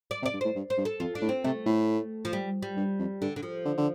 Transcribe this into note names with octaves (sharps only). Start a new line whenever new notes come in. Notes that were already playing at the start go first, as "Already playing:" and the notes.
D5
C3
D5
G2
A2 C5
G2
C5
G2
A4
F2 F4
D4
A2
C4
C3 A3
A2
F3
G3
G3
G2
F2
G2 D3
D3
F3
D3
D3